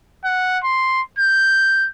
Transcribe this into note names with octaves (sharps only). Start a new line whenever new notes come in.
F#5
C6
G6